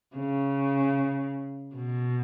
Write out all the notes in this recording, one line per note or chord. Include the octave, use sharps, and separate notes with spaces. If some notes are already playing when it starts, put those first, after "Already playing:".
C#3
B2